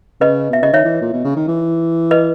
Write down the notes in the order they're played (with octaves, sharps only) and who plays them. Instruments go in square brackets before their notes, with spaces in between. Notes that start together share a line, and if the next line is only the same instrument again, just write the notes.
[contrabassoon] C#3 [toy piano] B4 D#5
[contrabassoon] B2 [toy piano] E5
[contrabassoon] C#3 [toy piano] D#5
[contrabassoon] D#3 [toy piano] C#5 E5
[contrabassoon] E3
A#2
B2
C#3
D#3
E3
[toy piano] B4 D#5